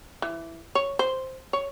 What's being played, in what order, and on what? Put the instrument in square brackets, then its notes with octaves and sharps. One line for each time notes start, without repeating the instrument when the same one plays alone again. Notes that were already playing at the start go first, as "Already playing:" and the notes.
[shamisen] E3
C#5
C5
C#5